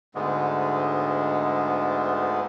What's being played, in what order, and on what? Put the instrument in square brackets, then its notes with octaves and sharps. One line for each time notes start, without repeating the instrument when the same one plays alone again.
[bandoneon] D2 G#2 D3 G#3 B3